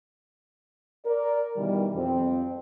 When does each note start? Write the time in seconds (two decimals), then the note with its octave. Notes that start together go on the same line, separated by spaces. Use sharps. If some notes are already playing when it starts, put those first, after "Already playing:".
1.05 A#4 D5
1.57 B2 D#3 E3 G3
1.96 F2 C4